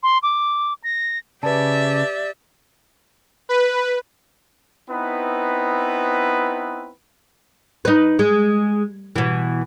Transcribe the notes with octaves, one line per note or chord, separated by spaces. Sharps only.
C6
D6
A#6
C#3 G4 B4 D5 E5 A5
B4
B3 C4 D#4 E4 B4
D#4 B4
G#3
B2 E3